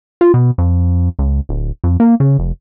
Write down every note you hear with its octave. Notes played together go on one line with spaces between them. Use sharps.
F4
B2
F2
C#2
D1
F2
A#3
C#3
F1